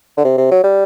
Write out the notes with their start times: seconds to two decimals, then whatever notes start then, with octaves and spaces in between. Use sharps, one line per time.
0.18 D3
0.24 C3
0.37 C3
0.52 F#3
0.64 G3